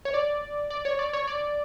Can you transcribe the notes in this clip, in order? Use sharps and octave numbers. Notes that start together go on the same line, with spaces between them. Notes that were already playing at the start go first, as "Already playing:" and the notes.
C#5
D5
D5
C#5
D5
C#5
D5